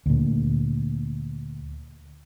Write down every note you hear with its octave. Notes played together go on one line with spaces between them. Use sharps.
D2 A#2